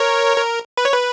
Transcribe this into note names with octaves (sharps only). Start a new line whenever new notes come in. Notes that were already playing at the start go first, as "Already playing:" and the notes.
Already playing: A#4 C#5
A#4
B4
C#5
B4